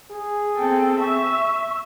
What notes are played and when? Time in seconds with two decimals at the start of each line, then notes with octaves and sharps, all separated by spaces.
0.11 G#4
0.57 C4 A4 G5
0.99 E5 C#6